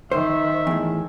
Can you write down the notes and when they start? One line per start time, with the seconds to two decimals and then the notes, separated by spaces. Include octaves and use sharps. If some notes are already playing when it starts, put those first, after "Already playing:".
0.12 D#3 C5 E5
0.67 E2 A2